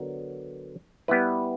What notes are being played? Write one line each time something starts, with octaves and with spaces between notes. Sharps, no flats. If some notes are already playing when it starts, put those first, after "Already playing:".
Already playing: D3 F#3 B3 A#4
G3 B3 E4 B4